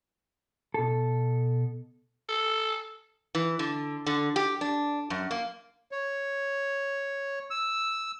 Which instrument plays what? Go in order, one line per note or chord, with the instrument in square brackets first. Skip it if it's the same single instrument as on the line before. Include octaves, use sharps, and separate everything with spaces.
[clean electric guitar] B2 A4
[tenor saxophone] A4
[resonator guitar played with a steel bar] E3
D3
D3
G4
D4
F#2
A#3
[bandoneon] C#5
E6